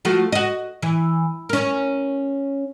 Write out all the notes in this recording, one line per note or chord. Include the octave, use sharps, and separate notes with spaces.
F3 A3 F#4
F#4 D#5
E3
C#4 A#4